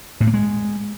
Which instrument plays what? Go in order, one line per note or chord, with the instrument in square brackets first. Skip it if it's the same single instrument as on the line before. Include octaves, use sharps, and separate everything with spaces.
[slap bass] A2
A#3
G#3